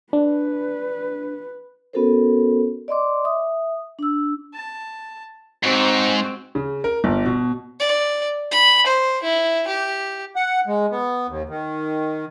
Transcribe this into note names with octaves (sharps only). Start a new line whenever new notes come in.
D4 B4
B3 C#4 F#4 A4 A#4 C5
D5 D#5 C6 D6
E5 D#6
D4 E6
A5
G#2 C4 F#4
C#3
A#4
G1
B2
D5
B5
C5
E4
G4
F#5
G#3
B3
D#2
D#3